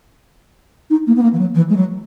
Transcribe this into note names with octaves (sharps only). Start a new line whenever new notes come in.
D#4
A#3
B3
A#3
E3
F#3
E3
G#3
F#3